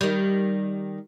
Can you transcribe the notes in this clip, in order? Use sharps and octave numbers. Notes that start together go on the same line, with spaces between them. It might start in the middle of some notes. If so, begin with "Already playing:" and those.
D#3 G3